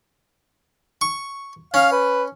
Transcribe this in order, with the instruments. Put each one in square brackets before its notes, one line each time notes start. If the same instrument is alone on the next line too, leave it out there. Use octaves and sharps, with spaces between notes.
[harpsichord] C#6
[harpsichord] C#4 [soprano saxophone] F5
[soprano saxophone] B4